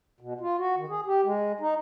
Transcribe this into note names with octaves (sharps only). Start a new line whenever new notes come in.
B2
F4
F#4
D#3
G#4
G4
G#3
D#4